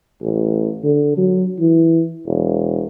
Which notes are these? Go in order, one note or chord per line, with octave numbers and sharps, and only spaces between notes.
A1
D3
F#3
E3
E1